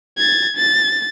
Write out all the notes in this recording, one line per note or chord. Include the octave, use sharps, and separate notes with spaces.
G#6 A6
A6